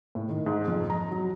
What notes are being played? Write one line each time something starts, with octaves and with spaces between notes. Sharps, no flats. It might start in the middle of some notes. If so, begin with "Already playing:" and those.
A2
D#3
G#2
F2
A#5
F#3